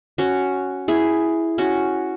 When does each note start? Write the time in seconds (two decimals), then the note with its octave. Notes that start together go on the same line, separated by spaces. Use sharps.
0.18 C#4 F#4
0.88 E4 G#4
1.58 C#4 F#4